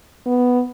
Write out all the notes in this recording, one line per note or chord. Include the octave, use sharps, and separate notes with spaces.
B3